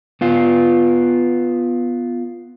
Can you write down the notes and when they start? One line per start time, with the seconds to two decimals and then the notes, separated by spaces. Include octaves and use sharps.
0.21 B3 F4